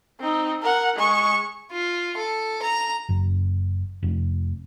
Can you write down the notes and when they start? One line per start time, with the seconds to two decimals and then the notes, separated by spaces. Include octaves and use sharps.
0.20 C4 D#4
0.62 A#4 F#5
0.96 G#3 C#6
1.72 F4
2.17 A4
2.63 A#5
3.09 F#1
4.03 F1